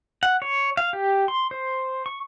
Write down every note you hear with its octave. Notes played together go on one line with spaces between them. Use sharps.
F#5
C#5
F5
G4
C6
C5
C#6